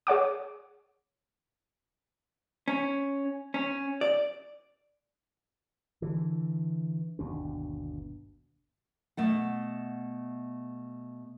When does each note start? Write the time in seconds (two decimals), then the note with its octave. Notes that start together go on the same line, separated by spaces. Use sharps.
0.07 G#4 C#5 F#5 D6
2.68 C#4
3.54 C#4
4.01 D5
6.02 D3 E3
7.19 G1 D#2 B2 D4
9.17 B2 A3 F#5